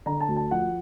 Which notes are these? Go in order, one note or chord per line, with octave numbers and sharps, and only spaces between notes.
D3 A#5
A5
D2
A5
F3 F#5